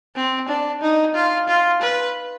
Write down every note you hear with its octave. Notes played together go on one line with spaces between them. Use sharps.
C4
D4
D#4
F4
F4
B4